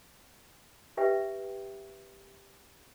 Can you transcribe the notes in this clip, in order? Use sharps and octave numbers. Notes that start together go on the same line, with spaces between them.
G4 B4 E5 G5